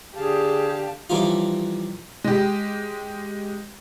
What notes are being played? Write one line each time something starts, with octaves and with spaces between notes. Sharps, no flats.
D3 G4 G#4 F5 A5
E3 F3 G3 C#4 D#4 F4
G#3 G4